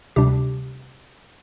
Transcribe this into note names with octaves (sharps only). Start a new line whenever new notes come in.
D2 C3 G3 D4 G4